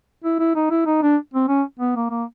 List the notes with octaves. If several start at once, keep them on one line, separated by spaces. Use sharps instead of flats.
E4
E4
D#4
E4
D#4
D4
C4
C#4
B3
A#3
A#3